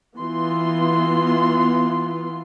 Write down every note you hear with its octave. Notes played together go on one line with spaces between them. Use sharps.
E3 B3 F4 C6